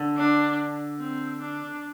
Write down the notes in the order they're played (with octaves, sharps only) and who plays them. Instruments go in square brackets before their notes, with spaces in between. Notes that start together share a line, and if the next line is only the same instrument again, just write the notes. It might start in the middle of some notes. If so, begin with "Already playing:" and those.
Already playing: [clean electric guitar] D3
[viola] D4
C4
D4